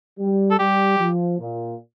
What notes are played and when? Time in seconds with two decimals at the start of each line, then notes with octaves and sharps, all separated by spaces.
0.19 G3
0.51 A4
0.59 G3 G4
0.99 F3
1.39 A#2